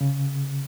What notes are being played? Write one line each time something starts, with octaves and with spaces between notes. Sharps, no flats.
C#3